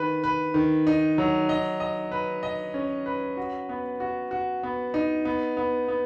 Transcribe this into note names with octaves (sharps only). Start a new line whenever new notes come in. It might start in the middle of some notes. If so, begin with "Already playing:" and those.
Already playing: D#3 B4
B4
D#3
D#4
F#3
D#5
D#5
B4
D#5
C#4
B4
F#4
B3
F#4
F#4
B3
D#4
B3
B3
B3